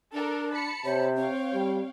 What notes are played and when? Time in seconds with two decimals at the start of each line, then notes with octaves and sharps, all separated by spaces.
0.13 D4 A4 A#4
0.52 A5 B5 C#7
0.85 C3 C5 C#5
1.16 C4 C#5 F5 G5
1.54 G3